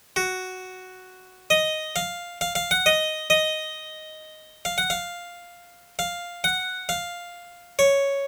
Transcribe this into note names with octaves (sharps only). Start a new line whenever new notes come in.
F#4
D#5
F5
F5
F5
F#5
D#5
D#5
F5
F#5
F5
F5
F#5
F5
C#5